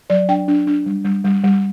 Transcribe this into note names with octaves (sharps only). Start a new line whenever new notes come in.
F#3 D5
D4 G5
D4
D4
G3
G3
G3
G3